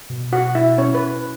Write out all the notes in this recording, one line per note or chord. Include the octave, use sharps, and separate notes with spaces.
B2
F#4 F#5
E4 E5
C#4 C#5
B4